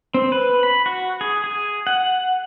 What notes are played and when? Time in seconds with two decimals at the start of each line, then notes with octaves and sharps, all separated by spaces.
0.14 C4
0.32 B4
0.63 B5
0.86 F#4
1.21 G#4
1.44 G#4
1.87 F#5